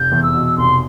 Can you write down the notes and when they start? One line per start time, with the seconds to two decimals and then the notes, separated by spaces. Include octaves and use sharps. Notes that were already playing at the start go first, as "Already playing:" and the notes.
Already playing: F1 G6
0.12 E2
0.23 E6
0.35 B2
0.57 F1 C6